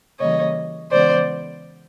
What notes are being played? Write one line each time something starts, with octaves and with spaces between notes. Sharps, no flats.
C#3 E3 G3 A#3 C#5 D#5
C#3 E3 G#3 B3 C5 D5